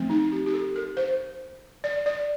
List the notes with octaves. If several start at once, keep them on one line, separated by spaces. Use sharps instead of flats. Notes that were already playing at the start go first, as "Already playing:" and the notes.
Already playing: F3 A3 C4
D#4
G4
G4
A4
A#4
C5
D5
D5